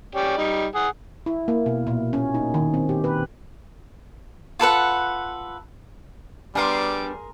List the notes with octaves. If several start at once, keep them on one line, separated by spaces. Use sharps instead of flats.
C#4 G4 D5
G3 D#4
G#4 F#5
E4
A#3
B2
A#2
C#4
D#4
D#3
C4
G4
B4
F4 A4 B4 F#5
G3 B3 D4 G#4 A#4 C6 D6